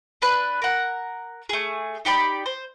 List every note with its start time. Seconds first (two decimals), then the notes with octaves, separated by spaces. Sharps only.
0.22 D4 B4 F#6
0.62 A#4 F#5
1.49 A3 G#4
2.05 D#4 G4 D5 B5
2.46 C5